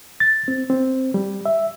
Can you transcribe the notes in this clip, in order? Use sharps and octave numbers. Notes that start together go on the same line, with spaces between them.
A6
C4
C4
G3
E5